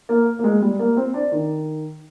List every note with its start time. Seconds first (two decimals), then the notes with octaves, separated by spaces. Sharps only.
0.09 A#3
0.39 A#3
0.44 G#3
0.62 G3
0.79 A#3
0.97 C4
1.14 D4
1.32 D#3